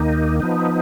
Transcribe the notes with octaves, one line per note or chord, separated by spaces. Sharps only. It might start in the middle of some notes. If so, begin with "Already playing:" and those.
Already playing: D#2 D#3 A#3 D#4
F3 B3 D#4